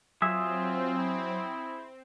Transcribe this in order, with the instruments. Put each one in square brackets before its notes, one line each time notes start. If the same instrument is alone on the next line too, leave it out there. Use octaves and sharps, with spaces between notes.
[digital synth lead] F#3 [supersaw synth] C4 [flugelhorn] F4 [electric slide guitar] G#4 E5
[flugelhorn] E4